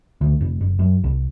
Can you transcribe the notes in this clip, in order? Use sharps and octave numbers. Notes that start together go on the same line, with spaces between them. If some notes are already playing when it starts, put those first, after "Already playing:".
D2
F1
F#1
F#2
C2